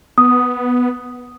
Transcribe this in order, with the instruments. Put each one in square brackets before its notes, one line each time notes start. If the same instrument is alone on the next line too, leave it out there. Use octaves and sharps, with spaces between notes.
[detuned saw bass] B3 [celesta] D#6